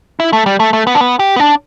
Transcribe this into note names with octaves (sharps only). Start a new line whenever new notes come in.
E4
A3
G3
A3
A3
B3
D4
B3
G4
B3
D4